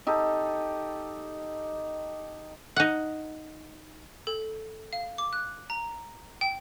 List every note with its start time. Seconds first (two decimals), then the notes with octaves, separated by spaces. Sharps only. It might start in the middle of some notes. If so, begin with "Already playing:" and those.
0.07 D#4 G4 A4
2.76 D#4 F#5
4.27 A4
4.93 F5
5.18 D6
5.33 F#6
5.70 A#5
6.41 G5